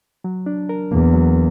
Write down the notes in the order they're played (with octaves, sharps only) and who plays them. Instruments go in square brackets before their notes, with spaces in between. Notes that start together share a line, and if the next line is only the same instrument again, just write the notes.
[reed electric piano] F#3
D4
A#4
[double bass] E2 [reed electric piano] A#3
[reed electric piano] F#3